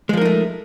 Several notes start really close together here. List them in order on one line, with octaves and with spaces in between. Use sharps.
G#3 F3 A#4 D#4 A3